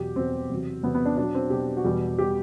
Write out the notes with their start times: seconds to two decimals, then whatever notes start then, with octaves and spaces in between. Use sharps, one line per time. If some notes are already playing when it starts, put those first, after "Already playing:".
Already playing: E2 B2 F#3 G4
0.16 E2 B2 F#3 C4
0.49 E2 C3 F#3
0.83 E2 C3 F#3 B3
0.95 B3
1.06 D4
1.17 B2 F#3 D4
1.35 C4
1.50 B2 F#3 G4
1.77 F#4
1.84 E2 B2 G3 G4
2.19 B2 G3 G4